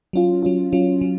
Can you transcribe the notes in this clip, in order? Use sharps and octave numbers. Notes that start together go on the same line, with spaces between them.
F#3 C#4 F4
F#3 C#4 F4
F#3 C#4 F4
F#3